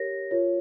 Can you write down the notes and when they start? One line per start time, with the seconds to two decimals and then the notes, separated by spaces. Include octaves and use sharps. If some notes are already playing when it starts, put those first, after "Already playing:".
Already playing: G4 A#4 C#5 A#6
0.31 F4 A#4 C#5